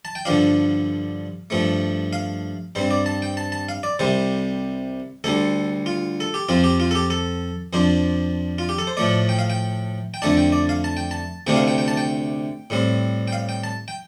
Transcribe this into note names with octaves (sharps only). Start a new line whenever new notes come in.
A5
G5
G2 D3 F3 D4 F5
G2 F3 A3
F5
G2 G3 C4 C5
D5
A5
G5
A5
A5
F5
D5
C2 C3 G3 C5
D2 D3 G3 A4
F4
A4
G4
F2 F3 C4 F4
G4
F4
A4
G4
A4
F2 F3 D4 C5
F4
G4
A4
C5
A2 F3 A3 D5
G5
F5
G5
G5
F2 D3 A3 D4 A5
G5
D5
F5
A5
G5
A5
D2 C3 A3 D4 G5
F5
G5
G5
A5
G5
A2 G3 C4
G5
F5
G5
A5
G5